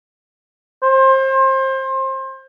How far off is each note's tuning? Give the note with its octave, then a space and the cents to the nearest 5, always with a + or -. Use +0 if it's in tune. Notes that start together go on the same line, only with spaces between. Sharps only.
C5 +30